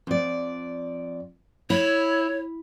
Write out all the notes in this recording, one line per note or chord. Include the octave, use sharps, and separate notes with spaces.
F2 D5
E4 C#5